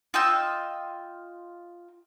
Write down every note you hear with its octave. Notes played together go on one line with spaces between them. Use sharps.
F4 D#5 G5 E6